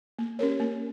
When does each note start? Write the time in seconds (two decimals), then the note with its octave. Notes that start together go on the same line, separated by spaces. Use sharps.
0.19 A#3
0.39 C#4 G4 A#4 C#5
0.60 A#3